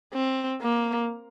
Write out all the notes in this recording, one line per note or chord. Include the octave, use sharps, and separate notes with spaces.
C4
A#3